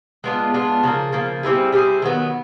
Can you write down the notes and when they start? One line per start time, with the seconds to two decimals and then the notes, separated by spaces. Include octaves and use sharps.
0.24 G#3 B3 D4 F4
0.54 G#3 B3 D4 F4
0.83 C#3 F3 A#3
1.12 C#3 F3 A#3
1.43 G3 C4 E4 G#4
1.72 G3 C4 E4 G#4
2.02 D#3 F#3 B3